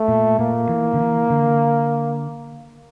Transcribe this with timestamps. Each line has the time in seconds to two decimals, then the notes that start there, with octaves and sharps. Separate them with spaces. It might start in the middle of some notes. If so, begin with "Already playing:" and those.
Already playing: A3
0.08 A#2
0.39 A#2 A#3
0.69 E3
0.94 D3
1.00 E3
1.30 D3